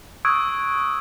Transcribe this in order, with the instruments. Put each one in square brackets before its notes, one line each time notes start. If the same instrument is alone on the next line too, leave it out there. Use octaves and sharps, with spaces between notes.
[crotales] C#6 D#6 E6 F#6 G#6 D7